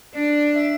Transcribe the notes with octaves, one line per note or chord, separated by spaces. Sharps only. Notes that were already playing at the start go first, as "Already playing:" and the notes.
D4 D5
E5